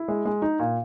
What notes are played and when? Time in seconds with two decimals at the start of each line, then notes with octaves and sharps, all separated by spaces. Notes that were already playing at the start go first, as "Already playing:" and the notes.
Already playing: E4
0.08 G#3
0.25 G#3
0.42 D#4
0.59 A#2